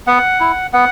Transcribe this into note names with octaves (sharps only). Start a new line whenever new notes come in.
B3 F#5
E4
B3 F#5